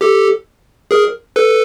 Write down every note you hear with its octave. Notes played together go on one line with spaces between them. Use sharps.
G4 A4
G#4 A#4
A4 B4